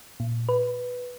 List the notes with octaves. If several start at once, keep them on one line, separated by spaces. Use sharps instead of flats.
A#2
B4